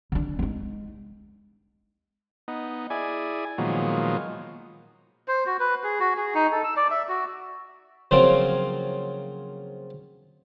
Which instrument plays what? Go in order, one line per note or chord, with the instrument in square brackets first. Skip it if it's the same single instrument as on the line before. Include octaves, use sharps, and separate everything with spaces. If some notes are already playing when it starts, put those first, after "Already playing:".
[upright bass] D3 D4
G#3 D#4
[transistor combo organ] B3 D#4
E4 G#4 D5 G#5
A#2 D#3 F3 F#3 G#3 B3
[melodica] C5
F#4
B4
G#4
F#4
G#4
D#4
A4
E6
D5
E5
F#4
[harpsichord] C#3 F3 F#3 A#3 C4 F4